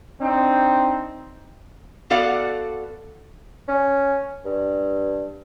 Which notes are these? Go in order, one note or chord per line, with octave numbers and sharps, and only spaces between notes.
C4 D4 D#4
B3 F#4 A4 D5 F5 F#5
C#4
G2